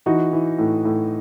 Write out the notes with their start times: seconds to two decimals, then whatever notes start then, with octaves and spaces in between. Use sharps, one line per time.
0.06 E3 D#4 F#4
0.33 E3
0.59 A2
0.85 A2